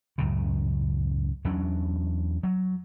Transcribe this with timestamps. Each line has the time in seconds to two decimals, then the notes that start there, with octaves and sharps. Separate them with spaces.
0.18 C#2 F#2 A2 C#3
1.45 E2 F#3 C#4 D4
2.43 F#3